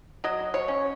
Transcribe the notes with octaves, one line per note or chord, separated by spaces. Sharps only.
F#3 D#5
C#5
C#4